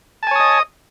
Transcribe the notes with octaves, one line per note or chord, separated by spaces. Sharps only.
C#5 D#5 G#5 A5 D#6